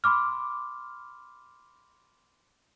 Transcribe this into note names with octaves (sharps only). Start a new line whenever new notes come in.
B5 C6 D6 F6